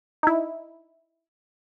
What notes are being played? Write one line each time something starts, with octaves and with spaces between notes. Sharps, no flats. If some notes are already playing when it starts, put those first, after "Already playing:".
D#4 E4